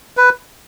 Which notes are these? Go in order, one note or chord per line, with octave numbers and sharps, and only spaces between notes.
B4